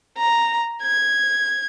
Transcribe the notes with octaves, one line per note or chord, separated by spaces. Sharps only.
A#5
G#6